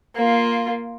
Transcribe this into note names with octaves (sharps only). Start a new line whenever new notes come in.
A#3 F4